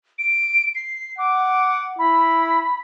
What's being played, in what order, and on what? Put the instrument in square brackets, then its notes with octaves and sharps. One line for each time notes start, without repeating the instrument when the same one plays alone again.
[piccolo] D7
C7
[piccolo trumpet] F#5 [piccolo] D6
[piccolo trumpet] E4 [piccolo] B5